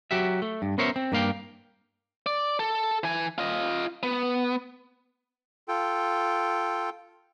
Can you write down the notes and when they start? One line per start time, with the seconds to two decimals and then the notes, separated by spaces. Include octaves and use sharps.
0.11 F#3 F#4 G4 E5
0.42 A3
0.62 G2
0.78 B3 C#4 A#4 C5 C#5 E5
0.96 C4
1.12 G2 A#3 F5 G5
2.26 D5
2.60 A4
3.04 E3 G#5
3.38 F4 D#5
4.03 B3
5.68 F4 A4 G5